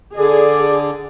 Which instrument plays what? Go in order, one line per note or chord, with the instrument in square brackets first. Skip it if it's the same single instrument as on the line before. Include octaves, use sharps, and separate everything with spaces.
[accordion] D3 [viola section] G#4 [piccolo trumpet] D5